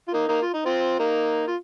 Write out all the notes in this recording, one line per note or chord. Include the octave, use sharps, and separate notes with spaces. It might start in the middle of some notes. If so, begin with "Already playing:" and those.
F4
A#3 D#4
A#3 D#4
F4
D#4
C4 F4
A#3 D#4
F4